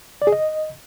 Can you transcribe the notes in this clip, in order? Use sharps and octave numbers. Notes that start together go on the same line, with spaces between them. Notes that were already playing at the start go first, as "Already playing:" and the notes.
D5
G#4
D#5